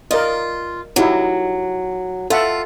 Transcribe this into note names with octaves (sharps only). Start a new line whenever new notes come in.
F4 A#4 D5 D#5
F#3 D#4 E4 G4
F4 A4 E5 F#5